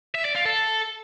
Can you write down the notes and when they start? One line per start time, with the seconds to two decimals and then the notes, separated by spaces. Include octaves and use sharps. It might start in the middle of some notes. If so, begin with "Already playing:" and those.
0.15 E5
0.25 D5
0.35 F4
0.46 A4